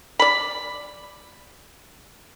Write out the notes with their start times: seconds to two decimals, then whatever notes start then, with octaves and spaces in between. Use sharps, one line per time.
0.19 D5 B5